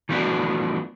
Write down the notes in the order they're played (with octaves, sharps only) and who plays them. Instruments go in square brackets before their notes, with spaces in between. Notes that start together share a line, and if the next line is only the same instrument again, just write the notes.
[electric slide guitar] E3 F3 A3 B3 D4 F#4